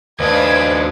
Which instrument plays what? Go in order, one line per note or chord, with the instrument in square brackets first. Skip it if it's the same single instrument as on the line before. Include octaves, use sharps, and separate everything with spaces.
[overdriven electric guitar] D#2 D4 [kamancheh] B4 F5 [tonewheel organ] C5 D#5 G#5 [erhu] G#6